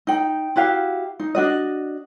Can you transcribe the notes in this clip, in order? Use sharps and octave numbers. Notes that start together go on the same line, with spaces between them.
D#4 G5
E4 F#4 G4 F5
D#4
D4 F#4 D#5